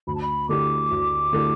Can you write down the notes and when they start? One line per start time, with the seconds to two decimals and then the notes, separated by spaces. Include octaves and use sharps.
0.07 D2 B5
0.15 A5
0.22 B5
0.49 D3 A3 E4 G4 D6
0.91 D2
1.33 D3 A3 E4 G4